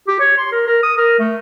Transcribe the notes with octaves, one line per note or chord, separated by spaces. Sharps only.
G4
C#5
C6
A#4
A#4
D#6
A#4
A3